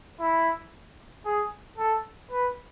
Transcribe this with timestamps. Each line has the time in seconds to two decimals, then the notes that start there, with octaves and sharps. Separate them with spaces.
0.20 E4
1.25 G#4
1.78 A4
2.31 B4